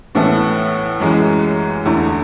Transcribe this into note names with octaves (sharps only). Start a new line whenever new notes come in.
A2 E3 B3 E4 A4
F#2 E3 G#3
E2 D3 A3 E4